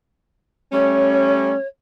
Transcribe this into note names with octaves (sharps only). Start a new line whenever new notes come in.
G3 A3 C#4 C#5